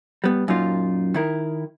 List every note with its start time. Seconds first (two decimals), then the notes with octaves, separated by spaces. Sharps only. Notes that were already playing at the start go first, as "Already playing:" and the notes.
0.24 G3 B3
0.48 F#2 A#2 D#4 F4
1.14 D#3 E4 A#4